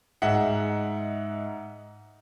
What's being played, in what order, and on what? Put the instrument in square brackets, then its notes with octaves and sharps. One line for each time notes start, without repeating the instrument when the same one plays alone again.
[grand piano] G#2 D#4 E5 F#5